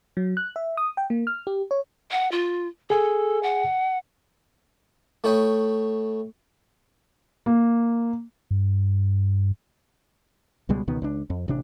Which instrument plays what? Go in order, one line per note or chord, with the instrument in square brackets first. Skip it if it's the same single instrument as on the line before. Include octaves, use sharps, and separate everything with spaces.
[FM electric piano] F#3
F#6
E5
D#6
G5
A#3
F6
G4
C#5
[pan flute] F#5
F4
[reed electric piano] G#4 G#5 [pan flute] A4
[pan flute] F#5
[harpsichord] A3 E4 C#5 G5 D#6
[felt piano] A#3
[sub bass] G2
[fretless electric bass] C#2 B2 G3 G#3
C#2 B2 D#3 B3
C#2 D4
F2
A1 C3 D4